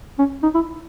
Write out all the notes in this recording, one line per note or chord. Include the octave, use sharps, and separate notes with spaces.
C#4
D#4
E4